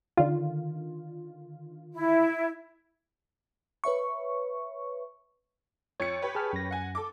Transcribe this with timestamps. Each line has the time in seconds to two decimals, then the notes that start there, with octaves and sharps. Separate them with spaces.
0.17 D3 D#3 F4
1.94 E4
3.84 B4 C#5 E5 C#6
6.00 F2 C#5 C#7
6.22 G4 B4 C#5
6.35 G#4 A5 F6
6.53 F#2 A#6
6.71 F#5 G#5
6.95 A4 D6